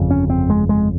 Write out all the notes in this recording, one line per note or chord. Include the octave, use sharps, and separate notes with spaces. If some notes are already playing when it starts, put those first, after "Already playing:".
Already playing: G1 F2 C#3
C#4
C4
G#3
G#3